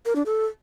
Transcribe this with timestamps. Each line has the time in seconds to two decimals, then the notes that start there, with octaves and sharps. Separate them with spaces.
0.06 A#4
0.16 D4
0.26 A4